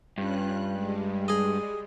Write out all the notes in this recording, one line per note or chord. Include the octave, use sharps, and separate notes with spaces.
G2 C#4 F4 F#6
G3 G#3
G#4 D#5